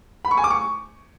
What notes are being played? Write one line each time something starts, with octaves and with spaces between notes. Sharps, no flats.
B5
C#6
G#5
D6
C#6